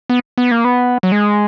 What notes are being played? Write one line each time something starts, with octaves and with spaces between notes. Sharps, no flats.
B3
B3
A#3
B3
F#3
G#3